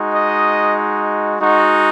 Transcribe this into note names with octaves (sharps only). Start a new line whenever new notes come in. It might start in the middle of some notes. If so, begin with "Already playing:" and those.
Already playing: G#3 D#4 F#4
D#5
G#3 D#4 F#4